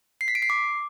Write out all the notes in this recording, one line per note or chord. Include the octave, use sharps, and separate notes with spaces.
C7
B6
D7
C7
D6